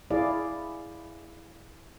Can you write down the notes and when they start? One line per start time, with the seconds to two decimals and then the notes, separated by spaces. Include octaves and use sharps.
0.10 E4 G#4 D5 F5